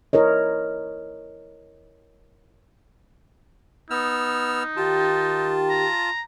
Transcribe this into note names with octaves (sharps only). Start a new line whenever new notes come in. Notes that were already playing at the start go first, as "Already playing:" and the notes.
E4 A#4 C#5 D#5
B3 D#4 E6 F6
D#3 F4 G4 A5
A#5